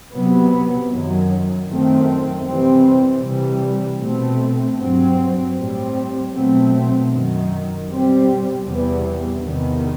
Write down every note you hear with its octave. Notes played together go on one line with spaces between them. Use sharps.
C3 F#3 B3
F#2 D#3 F#3
F#2 D#3 A3 C4
C3 E3 G3 C4
C3 E3 G3
B2 A3 C4
G2 F#3 C4
A2 G3 C4
B2 F#3 A3 C4
F#2 D#3 F#3
B2 G3 C4
E2 C3 E3 G3
E2 C3 D#3